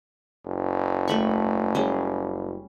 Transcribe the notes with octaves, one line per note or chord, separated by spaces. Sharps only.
F#1
A3 B5 C#6
G3 C#4 G#4